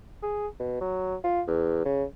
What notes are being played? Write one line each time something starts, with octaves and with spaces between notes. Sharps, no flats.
G#4
B2
F#3
F4
E2
C#3